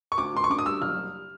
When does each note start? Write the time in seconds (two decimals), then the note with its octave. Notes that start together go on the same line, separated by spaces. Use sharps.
0.12 C#6
0.18 D2 D6
0.34 D2 C6
0.44 C#6
0.50 D3 D6
0.59 D#6
0.66 G3 E6
0.81 F#1 F6
0.98 G3